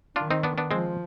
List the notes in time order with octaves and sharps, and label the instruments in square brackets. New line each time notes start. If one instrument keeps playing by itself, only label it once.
[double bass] D#3 [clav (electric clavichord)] D4 F4
[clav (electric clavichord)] C4 D#4
B3 D4
B3 D4
[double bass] F3 [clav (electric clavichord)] G#3 C4